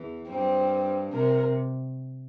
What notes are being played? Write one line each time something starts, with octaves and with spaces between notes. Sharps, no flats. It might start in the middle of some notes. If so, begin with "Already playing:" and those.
Already playing: E2 E3
G2 G3 C4
C3 A#4